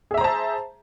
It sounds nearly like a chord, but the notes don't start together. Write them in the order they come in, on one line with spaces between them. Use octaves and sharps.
G#4 E5 A#5 C5 A5